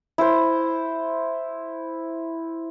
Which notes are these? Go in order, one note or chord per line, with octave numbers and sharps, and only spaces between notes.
E4 C5